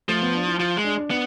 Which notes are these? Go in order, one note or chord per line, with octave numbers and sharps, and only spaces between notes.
F3 A3
B3
D4
E4
F3 F4
G#3
D4
D4
B3 D4